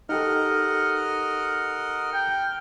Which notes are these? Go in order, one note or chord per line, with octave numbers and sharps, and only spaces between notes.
D#4 G4 A4 A#4 D#5 F#5 F6
G5